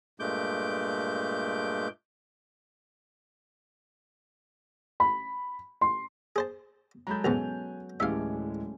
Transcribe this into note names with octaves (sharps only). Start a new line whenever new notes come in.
G2 A#2 G#3 A3 D6 G6
B5
C6
G#4 C5 A5
F#3 G#3 A4 A#5 B5 G6
B1 E2 G#2 B3 C#4 G#5 F7
D1 E3 G#3 A3 C#4 G4 E5 F5